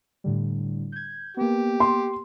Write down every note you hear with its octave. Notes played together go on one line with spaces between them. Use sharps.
A2 D3 G3
G6 G#6
A#3 B3 G4
C6